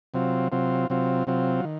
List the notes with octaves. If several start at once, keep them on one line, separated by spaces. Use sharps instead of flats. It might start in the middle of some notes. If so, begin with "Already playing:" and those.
C3 F#3 C4 F4
C3 F#3 C4 F4
C3 F#3 C4 F4
C3 F#3 C4 F4
D#3